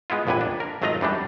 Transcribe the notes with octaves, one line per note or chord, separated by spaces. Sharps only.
G#3 B3 E4 F4
A#1 F2 A2 C3 B4 G#5
D4
A#4
G#1 F#3 A3 F4 D#5 A#5
F#2 E3 G3 D4